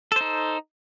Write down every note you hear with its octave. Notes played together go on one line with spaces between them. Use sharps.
D#4 A4 C5